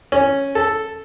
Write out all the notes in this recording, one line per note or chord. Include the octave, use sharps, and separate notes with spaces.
C#4
A4